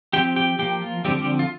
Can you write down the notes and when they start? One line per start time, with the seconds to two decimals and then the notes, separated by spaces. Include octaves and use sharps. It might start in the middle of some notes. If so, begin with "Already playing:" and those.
0.13 F3 C4 G4 G5
0.36 G4 G5
0.59 F3 A#3 G4 G5
0.82 F4
1.05 D3 F3 G3 C4 G4
1.15 G3 G4
1.39 F4